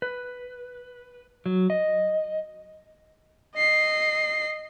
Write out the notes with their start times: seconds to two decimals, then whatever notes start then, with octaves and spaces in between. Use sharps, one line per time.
0.02 B4
1.46 F#3
1.70 D#5
3.56 D#5 C7